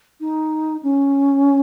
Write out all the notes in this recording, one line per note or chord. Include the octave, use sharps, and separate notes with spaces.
D#4
C#4